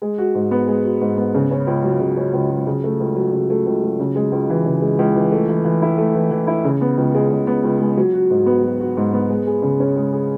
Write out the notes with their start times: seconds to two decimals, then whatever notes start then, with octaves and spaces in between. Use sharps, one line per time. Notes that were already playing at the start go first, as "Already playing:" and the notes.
0.02 G#3
0.18 F#4
0.35 G#2
0.51 B3
0.68 G#3
0.84 F#4
1.01 G#2
1.17 B3
1.34 C#3
1.51 C#4
1.67 C#2
1.84 F#3
2.00 C#3
2.17 C#4
2.33 C#2
2.50 F#3
2.67 C#3
2.84 A3
3.00 C#2
3.16 F#3
3.32 C#3
3.50 A3
3.66 C#2
3.83 F#3
4.00 C#3
4.16 G#3
4.32 C#2
4.49 E3
4.65 C#3
4.82 G#3
4.99 C#2
5.15 E3
5.32 A3
5.48 E3
5.65 E3
5.82 E4
5.98 A3
6.15 E3
6.31 E3
6.47 E4
6.64 C#3
6.81 B3
6.98 C#2
7.15 G#3
7.31 C#3
7.47 B3
7.64 C#2
7.81 G#3
7.97 F#3
8.14 F#4
8.30 G#2
8.46 B3
8.63 F#3
8.80 F#4
8.97 G#2
9.13 B3
9.29 G#3
9.47 G#4
9.62 C#3
9.80 C#4
9.96 G#3
10.13 G#4